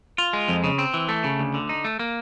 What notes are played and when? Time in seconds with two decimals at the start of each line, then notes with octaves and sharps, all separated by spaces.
0.18 F4
0.33 G#3
0.48 F2
0.64 C#3
0.78 C4
0.94 E3
1.09 A3
1.24 C#3
1.39 D2
1.54 D3
1.69 D#4
1.84 A3
1.99 A#3